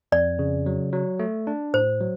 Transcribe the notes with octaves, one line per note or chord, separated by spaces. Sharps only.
F2 D5
C#3
F#3
F#3
A3
D4
A2 C5
F#3